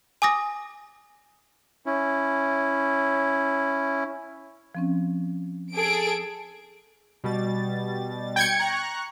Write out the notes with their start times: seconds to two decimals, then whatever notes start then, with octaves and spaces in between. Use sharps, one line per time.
0.22 G#5 D6 D#6 A#6
1.86 C#4 E4
4.75 F3 C4 C#4
5.74 G#4 A4 D7
7.24 B2 G3 A6
8.36 G5 G#6 C#7
8.59 A#5 C#6 F#6